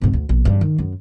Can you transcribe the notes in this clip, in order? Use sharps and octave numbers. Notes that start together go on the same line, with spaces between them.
G#2 C3
D2
A#1 B2
G2 C#3
D#3
F#2